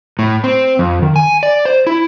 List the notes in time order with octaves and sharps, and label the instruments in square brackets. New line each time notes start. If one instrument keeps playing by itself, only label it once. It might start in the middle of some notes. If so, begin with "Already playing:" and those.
[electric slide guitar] A2
C4
F2
D#3
G#5
D5
C5
E4